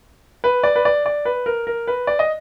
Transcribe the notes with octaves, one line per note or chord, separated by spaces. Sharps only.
B4
D5
B4
D5
D5
B4
A#4
A#4
B4
D5
D#5